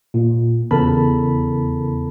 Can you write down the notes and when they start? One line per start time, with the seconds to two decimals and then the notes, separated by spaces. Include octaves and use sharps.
0.14 A#2
0.71 E2 C#3 A4 A#4 A5 B5